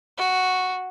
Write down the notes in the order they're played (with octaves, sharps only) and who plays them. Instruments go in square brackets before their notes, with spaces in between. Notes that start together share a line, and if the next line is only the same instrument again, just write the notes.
[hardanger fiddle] F#4